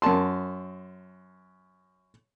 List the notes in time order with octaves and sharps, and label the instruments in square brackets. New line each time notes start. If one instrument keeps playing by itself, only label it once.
[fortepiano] F#2 A#4 A5 C6